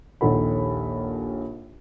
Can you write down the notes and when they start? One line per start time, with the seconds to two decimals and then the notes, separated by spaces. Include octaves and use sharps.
0.21 A#1 D#2 D#3 A4 F#5 B5